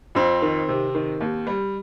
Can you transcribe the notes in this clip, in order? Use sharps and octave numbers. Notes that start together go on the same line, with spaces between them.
F2 C4
D#3
C3
D#3
D#2
G3